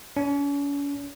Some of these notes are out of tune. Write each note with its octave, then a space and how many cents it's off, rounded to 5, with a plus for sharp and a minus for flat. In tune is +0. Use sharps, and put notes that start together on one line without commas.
C#4 +40